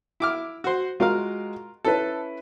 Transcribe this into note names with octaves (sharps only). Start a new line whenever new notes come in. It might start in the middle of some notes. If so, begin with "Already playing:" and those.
E4 D6 F6
F#4 C5
G#3 F4 F#4 A#4 F5
C#4 E4 A4 B4